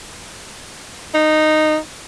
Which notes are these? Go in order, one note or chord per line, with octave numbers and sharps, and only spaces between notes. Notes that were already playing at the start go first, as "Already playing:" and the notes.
D#4